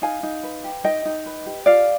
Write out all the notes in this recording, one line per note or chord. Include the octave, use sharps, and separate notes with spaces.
D#4 F5 G#5
D#4
B4
G4
D#4 D#5 G5
D#4
B4
G4
F4 D5 F5